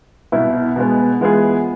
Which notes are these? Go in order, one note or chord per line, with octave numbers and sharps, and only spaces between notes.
C2 B2 B3 E4
B2 G#3 B3
E3 G#3 B3 F4 G#4